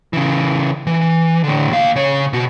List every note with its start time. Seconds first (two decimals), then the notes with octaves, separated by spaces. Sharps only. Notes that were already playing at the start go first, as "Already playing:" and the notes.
0.13 C#3 E3
0.87 E3
1.44 A2 D3
1.69 D#2 F5
1.95 C#3 C#5
2.33 B2 F#4